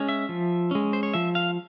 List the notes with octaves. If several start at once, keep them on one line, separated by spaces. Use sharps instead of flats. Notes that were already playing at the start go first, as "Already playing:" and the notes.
Already playing: G#3 C#4
E5
F3
G#3 C#4
C5
C#5
F3 E5
F5